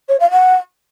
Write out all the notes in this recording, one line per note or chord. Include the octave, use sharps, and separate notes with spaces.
C#5
F5
F#5